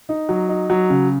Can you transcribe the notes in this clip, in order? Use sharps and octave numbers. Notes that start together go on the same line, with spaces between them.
D#4
F#3
D#4
F#3
C#3